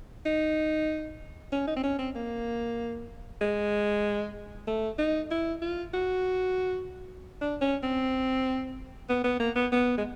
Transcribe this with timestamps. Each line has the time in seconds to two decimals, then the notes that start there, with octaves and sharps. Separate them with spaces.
0.26 D#4
1.52 C#4
1.67 D#4
1.76 C4
1.84 C#4
1.99 C4
2.15 A#3
3.41 G#3
4.67 A3
4.98 D#4
5.31 E4
5.62 F4
5.94 F#4
7.41 D4
7.61 C#4
7.83 C4
9.09 B3
9.24 B3
9.40 A#3
9.56 B3
9.72 B3
9.98 G#3